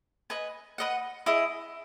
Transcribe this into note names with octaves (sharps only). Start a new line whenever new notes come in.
B4 D#5 G#5
B4 D#5 F#5
E4 G#4 D#5